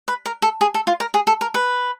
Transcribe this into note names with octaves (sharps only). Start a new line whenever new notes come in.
B4
A#4
A4
G#4
A4
F4
A#4
G#4
A4
A#4
B4